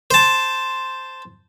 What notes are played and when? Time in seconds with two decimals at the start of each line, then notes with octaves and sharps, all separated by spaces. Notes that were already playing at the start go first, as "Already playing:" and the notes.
0.11 C5 A5